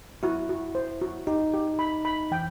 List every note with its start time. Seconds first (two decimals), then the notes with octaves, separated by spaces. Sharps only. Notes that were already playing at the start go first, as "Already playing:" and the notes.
0.23 E4 F#4
0.49 F#4
0.75 C5
1.01 F#4
1.27 D#4 G4
1.54 G4
1.79 B5
2.05 B5
2.31 E3 G5